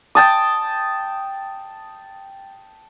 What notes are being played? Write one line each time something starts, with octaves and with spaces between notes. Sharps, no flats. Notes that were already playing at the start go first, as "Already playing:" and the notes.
G5 A5 D#6